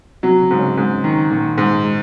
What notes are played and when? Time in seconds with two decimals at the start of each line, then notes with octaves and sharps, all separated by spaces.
0.23 C3 F#3 C4
0.41 C#3 C#4
0.51 G#2
0.59 C#3 C#4
0.77 G#2
1.04 D#3
1.30 A#2 D#3 A#3
1.58 G#2
1.85 G#3